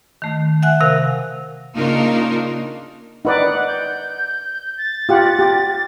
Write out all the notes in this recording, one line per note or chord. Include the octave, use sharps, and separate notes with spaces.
D#3 A3
E5 F#5 G#5 F#6
C3 A#4 F5
C#3 A#3 D4 D#4 F4 A#4
D#4 B4 D5 F#5
G6
A6
F4 G4 F#5
G4